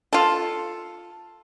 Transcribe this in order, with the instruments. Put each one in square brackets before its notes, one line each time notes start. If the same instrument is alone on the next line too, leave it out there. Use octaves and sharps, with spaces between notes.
[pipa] F4 A4